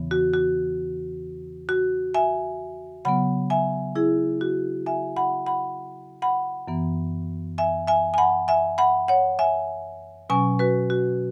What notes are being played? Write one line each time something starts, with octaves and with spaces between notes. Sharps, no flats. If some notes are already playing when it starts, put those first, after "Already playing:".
Already playing: E2 C#3 E3 B3
F#4
F#4
F#4
E5 G#5
C#3 F#3 B3 F#5 B5
E5 G#5
E4 G#4
F#4
E5 G#5
F#5 B5
F#5 B5
F#5 B5
F#2 E3 B3
E5 G#5
E5 G#5
G#5
F#5 B5
E5 G#5
F#5 B5
C#5 F#5
E5 G#5
B2 F#3 C#4 G#5 C#6
F#4 B4
F#4